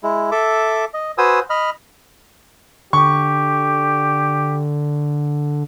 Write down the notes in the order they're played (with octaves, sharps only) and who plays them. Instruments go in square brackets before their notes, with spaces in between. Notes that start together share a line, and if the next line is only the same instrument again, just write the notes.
[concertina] G#3 E4
A4 E5 D6
D#5
F#4 B4 C5 G#5 D#6 E6
D#5 B5 F6
[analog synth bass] D3 [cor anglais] G4 [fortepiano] C#6